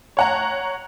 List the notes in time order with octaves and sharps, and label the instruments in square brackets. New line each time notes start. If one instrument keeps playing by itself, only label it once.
[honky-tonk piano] C#5 F#5 A#5